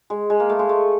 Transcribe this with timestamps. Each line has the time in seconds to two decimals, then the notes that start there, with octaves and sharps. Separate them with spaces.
0.10 G#3
0.30 G#3
0.40 A#3
0.49 A3
0.59 G#3
0.69 A3